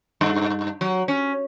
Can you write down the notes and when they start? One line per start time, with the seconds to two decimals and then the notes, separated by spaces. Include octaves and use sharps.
0.21 G2
0.81 F#3
1.08 C#4